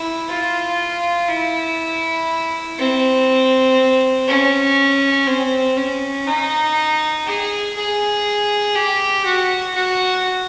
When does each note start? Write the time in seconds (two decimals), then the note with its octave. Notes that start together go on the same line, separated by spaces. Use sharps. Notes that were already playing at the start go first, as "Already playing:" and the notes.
Already playing: E4
0.29 F4
1.28 E4
2.78 C4
4.27 C#4
5.27 C4
5.77 C#4
6.26 D#4
7.26 G#4
7.75 G#4
8.75 G4
9.25 F#4
9.75 F#4